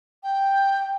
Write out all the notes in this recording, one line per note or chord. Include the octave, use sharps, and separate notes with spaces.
G5